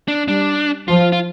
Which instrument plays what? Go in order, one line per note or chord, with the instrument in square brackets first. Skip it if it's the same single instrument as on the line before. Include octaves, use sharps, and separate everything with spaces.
[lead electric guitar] D4
[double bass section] G3 [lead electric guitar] D4
[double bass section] F3 [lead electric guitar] F4
[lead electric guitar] F4